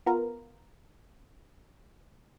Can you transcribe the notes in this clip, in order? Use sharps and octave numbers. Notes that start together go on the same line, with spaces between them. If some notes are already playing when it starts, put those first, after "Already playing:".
B3 F4 A#4